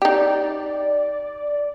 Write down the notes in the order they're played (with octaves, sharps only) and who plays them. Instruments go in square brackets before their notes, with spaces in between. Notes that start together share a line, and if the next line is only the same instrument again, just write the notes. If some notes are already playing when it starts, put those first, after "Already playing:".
[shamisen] D#4 G4 [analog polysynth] D5